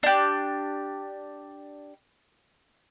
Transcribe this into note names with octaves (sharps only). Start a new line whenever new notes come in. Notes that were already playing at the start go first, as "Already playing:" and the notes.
D4 G4